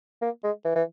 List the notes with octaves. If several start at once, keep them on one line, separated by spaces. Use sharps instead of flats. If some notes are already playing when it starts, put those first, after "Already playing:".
A#3
G#3
E3
E3